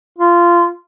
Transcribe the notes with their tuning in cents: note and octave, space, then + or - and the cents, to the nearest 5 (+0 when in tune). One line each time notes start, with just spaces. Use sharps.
F4 -15